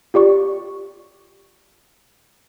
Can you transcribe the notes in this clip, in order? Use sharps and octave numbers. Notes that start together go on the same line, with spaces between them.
F4 G4 D5 C#6